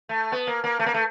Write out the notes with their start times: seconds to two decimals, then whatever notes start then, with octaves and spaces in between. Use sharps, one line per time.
0.09 A3
0.32 B3
0.47 A#3
0.64 A#3
0.79 A3
0.86 A#3
0.94 A3